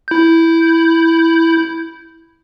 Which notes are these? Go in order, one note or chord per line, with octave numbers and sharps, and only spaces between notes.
E4 G6